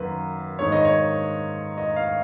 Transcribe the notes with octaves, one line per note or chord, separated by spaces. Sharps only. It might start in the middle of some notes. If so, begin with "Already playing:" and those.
Already playing: F#2 D#3 A#3 B4
G#2 D#3 A#3 D#4 C#5
D#5
C#5
D#5
F5